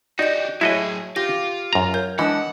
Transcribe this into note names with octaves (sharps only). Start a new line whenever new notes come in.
D#4 F#4 G4 D5 D#5 G6
A2 F#3 E4 F#4 G#4 C#5 D#5 E5
F4 G4 A#6
F#2 A#5
A#4 C#5 G6
E3 G#3 D4 D#5 F#5 A5 D#6